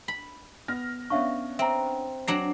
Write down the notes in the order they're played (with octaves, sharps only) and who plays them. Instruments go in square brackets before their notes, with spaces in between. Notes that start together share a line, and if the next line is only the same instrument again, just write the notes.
[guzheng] B5
[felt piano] B3 F6 A#6
[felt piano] B3 C#4 D4 [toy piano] E5 F5 C#6
[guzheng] C4 [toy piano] E5 A#5
[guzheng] F#3 D4 A#5 [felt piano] C7